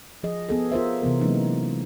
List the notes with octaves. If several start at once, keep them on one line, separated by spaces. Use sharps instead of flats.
F3 G#4 D#5
B3 G#4 A4
F4 A#4 C5 E5
C3 E3 B3 A#4
E3 F#3 G#3 A#3 C#4 D#4